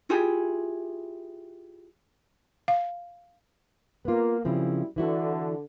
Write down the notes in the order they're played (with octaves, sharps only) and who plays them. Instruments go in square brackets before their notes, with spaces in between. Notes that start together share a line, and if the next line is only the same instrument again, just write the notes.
[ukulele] E4 F4 G4 G#4
[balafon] F5
[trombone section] A#3 [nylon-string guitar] B3 F4
[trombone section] F#2 G3 E4 [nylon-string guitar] C#3 F3 C4
[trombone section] D3 [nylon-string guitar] E3 E4 F#4